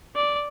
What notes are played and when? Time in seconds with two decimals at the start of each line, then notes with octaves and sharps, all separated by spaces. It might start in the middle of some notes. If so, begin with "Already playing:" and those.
0.16 D5